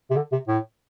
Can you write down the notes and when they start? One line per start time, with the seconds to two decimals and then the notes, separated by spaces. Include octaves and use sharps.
0.10 C3
0.16 D3
0.32 C3
0.48 A2